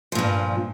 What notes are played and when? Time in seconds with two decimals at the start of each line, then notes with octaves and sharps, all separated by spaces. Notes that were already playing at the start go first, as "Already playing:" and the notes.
0.12 F3
0.15 A#2
0.19 G2